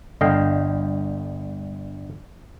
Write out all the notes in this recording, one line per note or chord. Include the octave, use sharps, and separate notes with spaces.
G1 D3 D#5 F5 G5